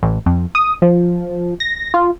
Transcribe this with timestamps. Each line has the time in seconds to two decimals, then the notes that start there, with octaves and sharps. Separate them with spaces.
0.03 A1
0.26 F2
0.55 D#6
0.82 F3
1.60 A#6
1.94 F4